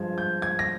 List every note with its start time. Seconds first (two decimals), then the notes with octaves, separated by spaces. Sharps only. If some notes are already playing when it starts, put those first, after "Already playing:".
Already playing: G2 F3 G#3 G#6
0.18 G6
0.42 G#6
0.59 A#6